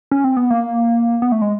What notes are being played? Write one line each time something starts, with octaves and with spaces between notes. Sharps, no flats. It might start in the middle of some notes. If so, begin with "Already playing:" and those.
C#4
C4
B3
A#3
B3
A3
G#3